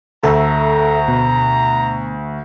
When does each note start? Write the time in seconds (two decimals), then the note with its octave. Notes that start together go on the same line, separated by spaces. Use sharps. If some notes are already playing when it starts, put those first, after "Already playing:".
0.23 D2 A4 E5 A#5
1.08 B2